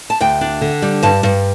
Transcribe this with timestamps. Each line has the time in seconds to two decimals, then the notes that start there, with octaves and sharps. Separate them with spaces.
0.10 A5
0.20 D2 G5
0.41 D4
0.61 D3
0.82 G3
1.03 G2 A5
1.23 G2